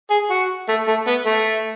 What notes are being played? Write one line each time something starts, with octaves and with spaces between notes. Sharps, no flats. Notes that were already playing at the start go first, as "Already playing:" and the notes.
G#4
F#4
A3
A3
B3
A3